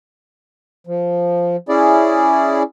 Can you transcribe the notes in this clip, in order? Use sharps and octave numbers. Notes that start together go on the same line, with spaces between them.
F3
C#4 E4 G#4 D5